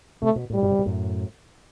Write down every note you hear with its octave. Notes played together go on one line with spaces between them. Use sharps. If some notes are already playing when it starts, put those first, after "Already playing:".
C3 A3
B2
A2 G3
G2 B2
C3
B2
F#2 A2